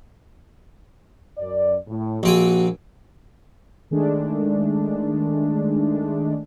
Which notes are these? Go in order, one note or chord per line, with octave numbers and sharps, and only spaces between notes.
F#2 D5
A2
A#1 A#3 C4 F#4 G#5
D#3 G#3 A3 D4